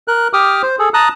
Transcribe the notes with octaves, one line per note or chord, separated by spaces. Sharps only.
A#4 F#6
G4 D6 D#6 F6
C5
G#4 A4
A5 A#5 D#6 F#6